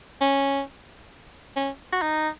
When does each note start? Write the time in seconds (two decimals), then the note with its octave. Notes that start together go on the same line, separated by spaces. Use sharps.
0.21 C#4
1.56 C#4
1.92 F#4
2.02 D#4